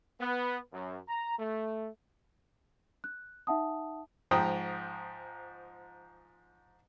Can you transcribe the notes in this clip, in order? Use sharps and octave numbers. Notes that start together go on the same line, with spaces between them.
B3
F#2
A#5
A3
F#6
D#4 E5 F#5 A5 D#6
G#2 F3 G5 A#5 D#6